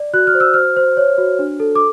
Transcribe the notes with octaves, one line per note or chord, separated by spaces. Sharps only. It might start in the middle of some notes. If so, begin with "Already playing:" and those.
Already playing: D5
F#4 F#6
F6
C5
E6
C5 F6
C5
C#5
F#4
D4
A4
D6